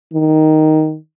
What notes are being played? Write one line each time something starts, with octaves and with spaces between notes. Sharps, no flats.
D#3